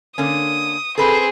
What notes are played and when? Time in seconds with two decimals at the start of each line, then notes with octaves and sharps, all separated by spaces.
0.18 D3 A#3 C#4 D#6
0.98 C4 G#4 A4 B4 C5